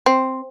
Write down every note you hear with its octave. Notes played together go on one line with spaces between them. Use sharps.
C4